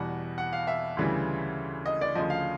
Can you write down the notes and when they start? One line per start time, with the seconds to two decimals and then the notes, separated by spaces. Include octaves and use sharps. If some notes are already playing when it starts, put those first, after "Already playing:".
Already playing: E2 B2 G3 F#5
0.38 F#5
0.53 F5
0.67 E5
0.97 D2 C#3 E3 G3
1.86 D#5
2.01 D5
2.15 D2 C#3 F3 D#5
2.30 F5